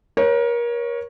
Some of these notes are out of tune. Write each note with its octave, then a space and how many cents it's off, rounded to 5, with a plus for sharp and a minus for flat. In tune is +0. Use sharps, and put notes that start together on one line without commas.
A#4 +30 C#5 -5